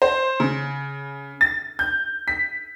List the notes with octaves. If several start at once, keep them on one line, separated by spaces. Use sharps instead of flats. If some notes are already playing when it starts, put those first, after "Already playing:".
C5
C#3
A6
G6
B6